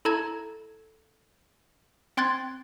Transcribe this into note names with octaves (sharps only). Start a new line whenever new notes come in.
E4 A4 A5 A#5 G#6
C4 G5 C6 F#6 G#6 A6